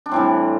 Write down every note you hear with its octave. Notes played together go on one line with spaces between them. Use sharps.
D4
A2 E3 G3 C4